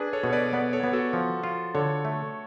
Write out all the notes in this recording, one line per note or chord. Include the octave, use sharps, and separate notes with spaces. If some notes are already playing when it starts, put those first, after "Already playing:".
Already playing: D4 G#4 B4
A4 C#5
B2
C#5
B4 D5
B3 B4 D5
A4 C#5
B3 B4
F#4 A4
F3
F4
D3 A4 C#5
A3